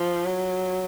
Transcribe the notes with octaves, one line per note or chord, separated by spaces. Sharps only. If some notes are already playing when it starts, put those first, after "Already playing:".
Already playing: F3
F#3